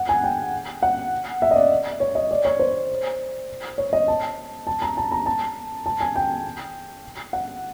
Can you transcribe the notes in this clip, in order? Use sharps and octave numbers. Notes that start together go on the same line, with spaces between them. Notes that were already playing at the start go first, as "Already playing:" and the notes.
Already playing: F#5
G#5
G5
F#5
E5
D#5
D5
C#5
D#5
D5
C#5
C5
C#5
D#5
A5
A5
A#5
A5
A#5
A5
A5
G#5
G5
F#5